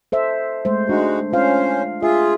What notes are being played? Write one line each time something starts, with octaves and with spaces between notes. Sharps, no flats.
A4 C5 E5
G#3 A3 C5
G#3 D4 D#4 F#4
C#4 F4 C5 F5
F4 G#4 E5